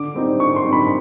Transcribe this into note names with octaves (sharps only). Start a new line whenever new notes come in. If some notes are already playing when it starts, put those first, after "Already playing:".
Already playing: D3 D6
G3 C4 D#4
D3 C#6
C6
G3 C4 D#4
B5